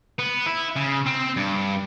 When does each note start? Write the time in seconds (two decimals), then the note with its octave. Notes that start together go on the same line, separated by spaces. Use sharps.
0.19 B3
0.46 E4
0.76 C#3
1.06 C4
1.36 G2